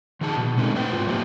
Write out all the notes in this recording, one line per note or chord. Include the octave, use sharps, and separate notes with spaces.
D#3 F3 D#4 G#4 A5
B2
G#3 A3 C4 D#4 A#4
A2 B4 C5 G5
G#2 F4
F3 F#3 A#3 G4